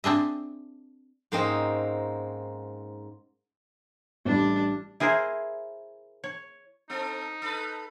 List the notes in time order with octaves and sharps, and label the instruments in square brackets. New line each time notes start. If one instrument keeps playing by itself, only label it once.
[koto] C4 D4 G#4 E5
[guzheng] G#2 A#3 C4 C#4 D#5
[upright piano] A1 G3 [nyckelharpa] D4
[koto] E4 G#4 A#4 C5
C#5
[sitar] C4 A4 [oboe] D#4
[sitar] A4 B4